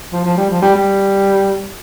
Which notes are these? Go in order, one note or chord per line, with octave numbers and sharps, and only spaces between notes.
F3
F3
G3
F3
G3
G3